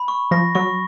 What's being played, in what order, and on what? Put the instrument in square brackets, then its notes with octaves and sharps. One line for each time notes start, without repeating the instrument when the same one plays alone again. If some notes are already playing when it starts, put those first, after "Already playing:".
Already playing: [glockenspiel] B5
C#6
[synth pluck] F3 [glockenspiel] A#6
[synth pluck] F#3 [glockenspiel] C#6